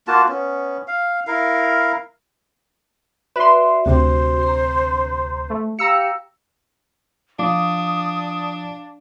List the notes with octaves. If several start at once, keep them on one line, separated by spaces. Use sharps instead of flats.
A#3 F4 F#4 A5
B3 C#4
F5
E4 A#4 F5
F#4 B4 D5 E5 C6
D2 C3 F#4 C5
A#5 C6
A3
G4 F5 A#5 E6 C#7
F3 D4 F5 D6 D#6